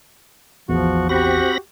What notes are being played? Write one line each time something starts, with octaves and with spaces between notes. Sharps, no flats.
A1 E2 F3 F#4
C4 F#4 G4 B5 A#6